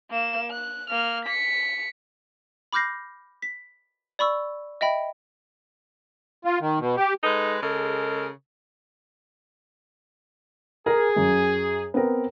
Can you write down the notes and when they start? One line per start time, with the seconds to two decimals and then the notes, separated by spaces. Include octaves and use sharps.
0.11 A#3 E7
0.51 F#6
0.90 A#3 F6
1.26 B6 C#7
2.73 B5 D6 F6 G6 A#6 C7
3.42 B6
4.19 D5 B5 C#6 E6
4.81 D#5 E5 G5 B5
6.45 F4
6.60 D#3
6.79 B2
6.97 G4
7.24 G#3 D#4 A4 B4
7.61 C#3 G#3 A4 A#4
10.86 G#4 A#4
11.16 F#2
11.94 B3 C4 A#4